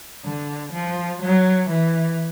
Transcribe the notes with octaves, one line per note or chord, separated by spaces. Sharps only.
D3
F3
F#3
E3